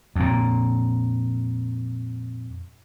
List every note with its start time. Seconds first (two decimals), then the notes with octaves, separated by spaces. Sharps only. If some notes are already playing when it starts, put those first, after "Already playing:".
0.16 F2 A#2